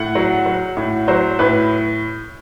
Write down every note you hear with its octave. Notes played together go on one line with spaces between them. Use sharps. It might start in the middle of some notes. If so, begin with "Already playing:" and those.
Already playing: A2 F#5
F#3
F#3
A2
F#3 C5
A2 B4